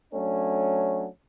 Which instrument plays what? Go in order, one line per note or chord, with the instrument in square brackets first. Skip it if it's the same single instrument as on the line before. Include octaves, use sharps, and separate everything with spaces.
[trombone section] F#3 A3 C#4 D4